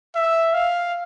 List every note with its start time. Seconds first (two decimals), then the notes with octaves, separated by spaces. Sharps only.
0.16 E5
0.54 F5